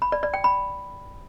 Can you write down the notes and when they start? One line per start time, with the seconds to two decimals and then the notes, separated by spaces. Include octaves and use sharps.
0.02 B5
0.12 D5
0.23 D5
0.34 G5
0.44 B5